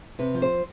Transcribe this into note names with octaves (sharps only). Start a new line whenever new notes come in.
C3 B4
F3
C5